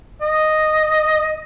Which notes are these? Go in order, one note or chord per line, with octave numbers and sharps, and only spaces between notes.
D#5